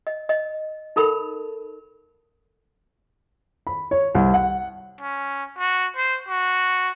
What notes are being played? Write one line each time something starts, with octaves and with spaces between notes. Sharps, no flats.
D#5
D#5
D#4 A4 A#4 B5
B5
C#5
C2
F#5
C#4
F#4
C5
F#4